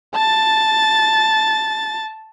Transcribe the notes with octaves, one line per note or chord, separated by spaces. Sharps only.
A5 A6